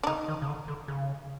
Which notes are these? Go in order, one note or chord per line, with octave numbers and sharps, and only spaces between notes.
D4
C#3 D#4
D#3
C#3
D3
D3
C#3